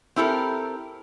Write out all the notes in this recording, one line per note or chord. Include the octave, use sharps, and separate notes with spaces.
C4 E4 G4 A4 A#4